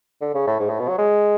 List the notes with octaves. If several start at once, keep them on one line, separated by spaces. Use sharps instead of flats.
D3
C#3
A2
G#2
A2
B2
F#3
G#3